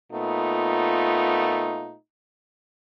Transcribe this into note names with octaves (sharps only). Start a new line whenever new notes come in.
A#2 A3 B3 D#4 F4